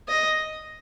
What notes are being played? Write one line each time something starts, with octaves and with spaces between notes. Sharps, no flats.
D#5